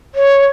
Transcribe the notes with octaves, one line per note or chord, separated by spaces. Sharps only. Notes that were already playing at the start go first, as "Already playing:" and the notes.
C#5